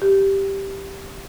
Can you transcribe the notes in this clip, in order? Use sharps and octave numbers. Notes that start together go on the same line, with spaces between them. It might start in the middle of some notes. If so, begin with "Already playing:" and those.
G4